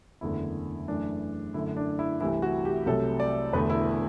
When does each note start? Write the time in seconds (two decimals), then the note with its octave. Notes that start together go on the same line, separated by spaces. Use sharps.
0.21 F#1 E2 D3 A3 E4
0.88 F#2 E3 A3 D4
1.54 F#2 D3 A3 E4
1.77 D4
1.99 E4
2.20 C2 C3 E3 A3 E4
2.42 F#4
2.65 G4
2.86 C2 C3 F#3 A3 A4
3.20 D5
3.53 E1 E2 D3 A3 B4
3.70 E4